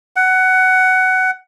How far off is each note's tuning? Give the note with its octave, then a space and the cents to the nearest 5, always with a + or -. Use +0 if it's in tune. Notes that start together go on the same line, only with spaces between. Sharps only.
F#5 +15